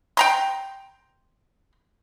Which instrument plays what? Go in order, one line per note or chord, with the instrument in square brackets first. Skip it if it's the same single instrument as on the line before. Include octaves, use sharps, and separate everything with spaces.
[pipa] G5 A#5 C6